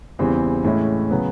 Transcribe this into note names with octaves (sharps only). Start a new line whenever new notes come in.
E2 C#3 E3 G3 C4
A2 E3 G#3 C#4 E4
C#3 F#3 B3